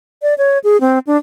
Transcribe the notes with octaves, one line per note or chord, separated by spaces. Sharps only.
D5
C#5
G#4
C4
D4